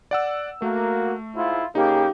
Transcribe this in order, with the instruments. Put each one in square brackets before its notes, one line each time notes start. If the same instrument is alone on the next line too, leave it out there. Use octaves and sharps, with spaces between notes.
[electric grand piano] D5 F#5 E6
[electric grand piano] A3 [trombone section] A#3 F#4
[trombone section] G#2 E4 F4
[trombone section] C#3 A#3 [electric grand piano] D#4 [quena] G4